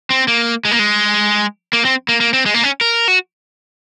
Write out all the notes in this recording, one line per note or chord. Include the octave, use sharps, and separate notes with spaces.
C4
A#3
G#3
A#3
G#3
A#3
C4
A#3
A#3
C4
G#3
A#3
C#4
A#4
F#4